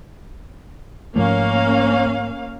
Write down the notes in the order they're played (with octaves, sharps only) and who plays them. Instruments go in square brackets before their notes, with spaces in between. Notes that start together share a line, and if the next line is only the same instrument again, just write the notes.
[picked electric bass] G#2 F3 A3 [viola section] A#3 C#4 F5